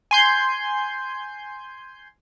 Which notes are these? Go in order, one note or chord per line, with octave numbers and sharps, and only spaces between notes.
G#5 C6 G6